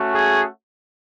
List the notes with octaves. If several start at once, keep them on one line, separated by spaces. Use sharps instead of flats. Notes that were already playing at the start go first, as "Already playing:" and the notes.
Already playing: A3 C#4 F#4
G#4